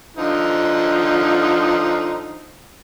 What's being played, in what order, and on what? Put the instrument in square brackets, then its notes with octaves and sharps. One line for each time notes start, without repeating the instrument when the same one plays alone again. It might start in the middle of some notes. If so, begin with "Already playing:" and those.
[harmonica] D3 F3 D#4